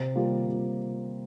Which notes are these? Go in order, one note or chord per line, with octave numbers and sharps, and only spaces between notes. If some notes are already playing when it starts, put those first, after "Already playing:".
Already playing: C3
G3 A#3 F4
C3